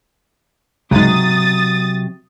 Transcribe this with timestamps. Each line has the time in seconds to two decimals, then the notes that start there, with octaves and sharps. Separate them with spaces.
0.91 C#2 G#2 C3 F#3 D#6 A6